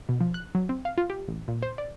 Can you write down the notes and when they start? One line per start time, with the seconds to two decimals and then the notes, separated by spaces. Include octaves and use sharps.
0.09 B2
0.21 F3
0.34 F#6
0.55 F#3
0.69 C4
0.85 F5
0.98 F4
1.10 G4
1.28 A1
1.48 A#2
1.63 C5
1.78 D5